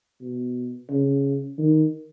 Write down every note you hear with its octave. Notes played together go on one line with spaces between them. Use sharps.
B2
C#3
D#3